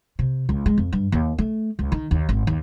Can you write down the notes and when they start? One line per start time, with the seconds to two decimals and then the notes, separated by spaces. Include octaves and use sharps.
0.19 C3
0.49 C#2
0.66 G#3
0.77 F2
0.93 G2
1.12 D#2
1.38 A3
1.79 C#2
1.92 D#3
2.11 D#2
2.29 G#1
2.47 D#2